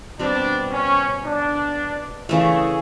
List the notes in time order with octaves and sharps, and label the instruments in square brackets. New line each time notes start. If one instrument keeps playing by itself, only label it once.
[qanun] B2 G3 C4 [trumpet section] D4
[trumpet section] C#4
D4
[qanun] C#3 E3 A3 [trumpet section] G#4